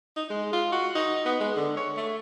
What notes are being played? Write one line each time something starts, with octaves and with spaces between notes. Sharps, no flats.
D#4
G#3
F4
F#4
D#4
B3
G#3
D3
C#5
A3